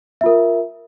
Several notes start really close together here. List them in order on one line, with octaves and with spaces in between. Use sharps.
E5 F4 A#4